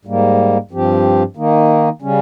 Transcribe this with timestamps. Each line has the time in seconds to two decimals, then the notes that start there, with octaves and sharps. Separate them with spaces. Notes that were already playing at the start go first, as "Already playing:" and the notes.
0.05 G#2 G3 A#3
0.71 G2 F3 C4 G4
1.36 D#3 A#3 D#4
2.02 C#3 G3 C#4